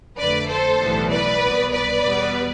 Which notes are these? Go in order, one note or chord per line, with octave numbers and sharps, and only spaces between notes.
F2 D3 A3 B4 D5
A4 C5
B1 A2 E3 G3 B3
B4 D5
C2 B2 B3
B4 D5
E2 B2 G3 B3